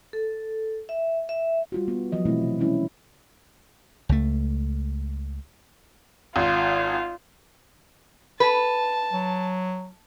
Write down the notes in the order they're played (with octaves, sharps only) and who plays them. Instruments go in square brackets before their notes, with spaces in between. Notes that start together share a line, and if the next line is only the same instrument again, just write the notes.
[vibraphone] A4
E5
E5
[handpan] G3 F4 F#4
B3
F3 F#3 D#5
B2 E3 A3 C4 E4
C3
E3 G3 G#3 C#4 E4
[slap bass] C#2 A3
[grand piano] G#1 [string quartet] F4
[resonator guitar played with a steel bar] B4 [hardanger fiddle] A5
[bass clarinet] F#3